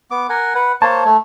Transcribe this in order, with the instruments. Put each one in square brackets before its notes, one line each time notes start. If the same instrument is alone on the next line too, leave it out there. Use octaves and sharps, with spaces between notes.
[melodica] B3 D6
A#4 F#5 G#5
B4 F#5
[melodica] A#3 C5 C#5 [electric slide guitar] A5
[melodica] A3